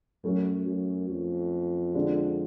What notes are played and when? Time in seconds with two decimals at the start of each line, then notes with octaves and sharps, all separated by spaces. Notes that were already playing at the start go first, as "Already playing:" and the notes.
0.24 F#2 F#3 A3 C#4
0.67 F#2
1.09 F2
1.95 D3 G#3 D4